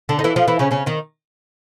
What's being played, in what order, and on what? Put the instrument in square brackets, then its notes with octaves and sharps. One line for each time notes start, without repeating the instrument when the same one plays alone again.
[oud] D3 D4
D#4
E3 E4
F3 F4
E3 E4
C#3 C#4
C#3 C#4
D#3 D#4